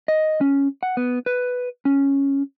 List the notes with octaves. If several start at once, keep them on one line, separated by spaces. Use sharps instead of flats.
D#5
C#4
F#5
B3
B4
C#4